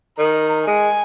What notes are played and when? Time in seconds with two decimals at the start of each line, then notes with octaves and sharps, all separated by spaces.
0.19 D#3 A#5
0.67 G#3 G#5